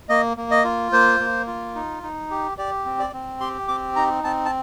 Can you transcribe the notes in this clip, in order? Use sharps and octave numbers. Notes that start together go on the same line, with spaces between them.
A#3 D#5
A#3
D#5
F4
A#3 C5
A#3
F4
D#4
D#4
G4
G4 D5
C4
D5
C4
G4 C6
C4 D6
D#4 A#5
C4 A5
A5